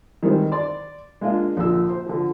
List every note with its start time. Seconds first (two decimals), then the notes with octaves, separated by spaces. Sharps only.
0.23 D#3 E3 G3 G#3 C4
0.52 D5 C6
1.21 G#3 A#3 D4 F4 D#5
1.57 A#1 A#2 D3 E6
1.89 C5
2.06 D3 F3